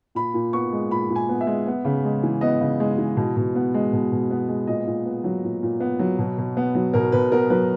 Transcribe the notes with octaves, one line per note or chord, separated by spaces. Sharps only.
A#2 B5
A#2
B3 C#6
G#3
A#2 B5
A#2
G#5
B3
E5
G#3
B3
C#3
G#3
E3
B3 D#5
C#3
G#3
E3
B2
B2
B3
G#3
B2
B2
B3
G#3
A#2 D#5
A#2
B3
F#3
A#2
A#2
B3
F#3
B2
B2
B3
F#3
B2 A#4
B2 B4
B3 A#4
F#3 B4